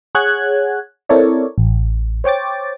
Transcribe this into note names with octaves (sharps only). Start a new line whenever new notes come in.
G#4 C#5 F#5 F#6 G#6
C4 E4 A4 A#4 C#5 D5
A1
C5 C#5 G5 D6 A6